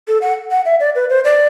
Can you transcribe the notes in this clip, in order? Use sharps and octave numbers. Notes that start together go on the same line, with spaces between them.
A4
F#5
F#5
E5
D5
B4
C5
D5